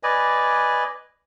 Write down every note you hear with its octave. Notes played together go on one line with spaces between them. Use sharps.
B4 D5 D#5 G#5